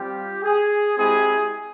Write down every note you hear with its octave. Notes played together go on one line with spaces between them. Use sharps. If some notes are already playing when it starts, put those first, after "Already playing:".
Already playing: G3 C4 F4 G4
G#4
G#3 C4 E4 G4 G#4